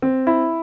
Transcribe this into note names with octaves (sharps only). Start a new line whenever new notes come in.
C4
E4